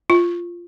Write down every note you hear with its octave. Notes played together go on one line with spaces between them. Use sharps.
F4